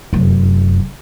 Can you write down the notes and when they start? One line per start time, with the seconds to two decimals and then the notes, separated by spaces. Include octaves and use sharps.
0.13 F1 F#2